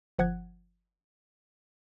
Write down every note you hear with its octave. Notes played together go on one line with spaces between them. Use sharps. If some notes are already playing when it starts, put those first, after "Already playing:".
G1 F3 F#5 F#6 G#6